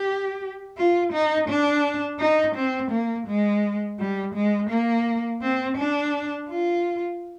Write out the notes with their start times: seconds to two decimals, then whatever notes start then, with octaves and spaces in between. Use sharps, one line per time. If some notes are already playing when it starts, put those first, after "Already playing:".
Already playing: G4
0.77 F4
1.12 D#4
1.48 D4
2.20 D#4
2.55 C4
2.91 A#3
3.27 G#3
3.99 G3
4.34 G#3
4.70 A#3
5.42 C4
5.77 D4
6.49 F4